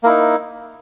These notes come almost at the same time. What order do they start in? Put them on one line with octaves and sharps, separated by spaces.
A#3 E4 D#4